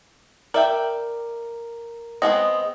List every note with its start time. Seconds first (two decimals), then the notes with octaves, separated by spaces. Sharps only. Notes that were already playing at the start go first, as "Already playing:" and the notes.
0.54 A#4 D5 E5 G5
2.22 G#3 B3 C4 D#5